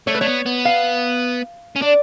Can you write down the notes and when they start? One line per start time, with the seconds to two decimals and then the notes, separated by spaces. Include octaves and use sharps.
0.07 A3 C#5
0.15 B4
0.21 A3 C#5
0.27 B3
0.46 B3
0.65 F5
1.76 C#4
1.82 D4 D5